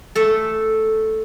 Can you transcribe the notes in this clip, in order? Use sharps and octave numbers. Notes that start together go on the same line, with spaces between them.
A3 A4